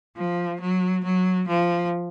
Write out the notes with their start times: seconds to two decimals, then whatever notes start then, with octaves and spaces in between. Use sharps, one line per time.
0.17 F3
0.61 F#3
1.04 F#3
1.48 F3